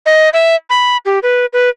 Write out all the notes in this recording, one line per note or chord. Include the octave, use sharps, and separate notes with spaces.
D#5
E5
B5
G4
B4
B4